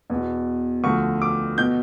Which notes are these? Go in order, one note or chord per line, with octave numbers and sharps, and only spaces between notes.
E2 B2
D2 D3 F3 C#6
D6
B2 G6